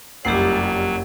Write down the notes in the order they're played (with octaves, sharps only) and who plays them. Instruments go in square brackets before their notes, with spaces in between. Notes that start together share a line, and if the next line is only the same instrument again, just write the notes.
[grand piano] F#1 F2 C7 [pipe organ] F#3 [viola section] G3 [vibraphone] G4 F#5